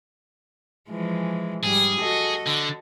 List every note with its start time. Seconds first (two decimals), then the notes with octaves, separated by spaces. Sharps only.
0.89 E3 F3 G#3
1.63 G#2 G3 G#4
2.01 F#4 A4 D#5
2.47 D3